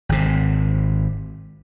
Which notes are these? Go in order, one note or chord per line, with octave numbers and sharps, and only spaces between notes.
G#1 C3